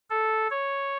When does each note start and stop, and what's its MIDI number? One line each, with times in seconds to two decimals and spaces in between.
0.10 0.48 69
0.50 0.97 73